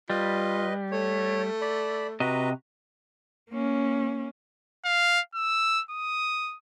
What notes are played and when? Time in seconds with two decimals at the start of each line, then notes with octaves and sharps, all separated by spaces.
0.10 G3 F4 B4 D#5
0.92 A3 C#5
1.61 D5 B5
2.20 C3 F#4 B4 D#5 A#5
3.50 A#3 C#4
4.85 F5
5.35 E6
5.91 D#6